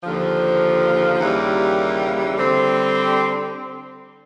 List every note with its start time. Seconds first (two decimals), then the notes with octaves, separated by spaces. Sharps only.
0.03 D#2 D3 F3
1.20 D#2 C#3 E3 G3 A#3
2.37 D3 G3 C4